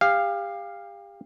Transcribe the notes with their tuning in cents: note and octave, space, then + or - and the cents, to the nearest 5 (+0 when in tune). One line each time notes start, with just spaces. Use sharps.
G4 +30 F5 -5